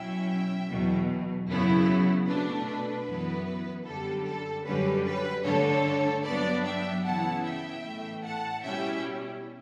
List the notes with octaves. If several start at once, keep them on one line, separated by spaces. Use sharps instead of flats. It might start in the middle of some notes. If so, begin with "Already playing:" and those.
Already playing: B2 F#3 C#4 E4 E5 G5
E2 B2 F#3
F#2 C#3 F#3 B3 E4
B2 A3 D4 B4
B4
F#2 E3 B3 E4
F#2 D3 G3 A4
A4
F#2 D3 G3 C#4 B4
B4
G2 D3 A3 A4 C#5
G2 F#3 B3 D4 B4 D5
E5 G5
C#3 E3 B3 E4 F#5 A5
E5 G5
A2 E3 A3
F#5 A5
B2 G3 C#4 E4 E5 G5